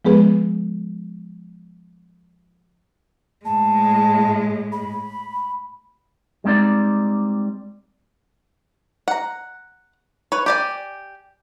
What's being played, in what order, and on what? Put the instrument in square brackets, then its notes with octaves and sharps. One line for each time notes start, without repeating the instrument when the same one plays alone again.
[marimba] F3 G#3 B3 G#4 B4
[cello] A2 G#3 [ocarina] A5
[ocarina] B5
[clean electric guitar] G3 G#3 C4 D#4 D5
[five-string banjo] F#5 A#5
B4 C#5
G4 D5 G#5